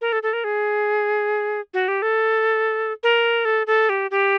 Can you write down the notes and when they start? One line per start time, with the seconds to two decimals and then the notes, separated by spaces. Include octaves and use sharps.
0.01 A#4
0.12 A4
0.23 A4
0.33 A#4
0.44 G#4
1.74 F#4
1.88 G4
2.02 A4
3.03 A#4
3.45 A4
3.67 A4
3.89 G4
4.11 G4